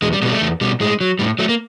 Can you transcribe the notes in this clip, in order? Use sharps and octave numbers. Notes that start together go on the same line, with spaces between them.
E2 G#3
G3
B2 G3 G#3
A3
E2
B2 G3
A2 G#3
F#3
A2 G3
F#3 A3
A#3